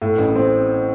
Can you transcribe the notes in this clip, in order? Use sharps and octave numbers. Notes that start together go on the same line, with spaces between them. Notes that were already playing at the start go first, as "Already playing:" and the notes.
A2
A1
C4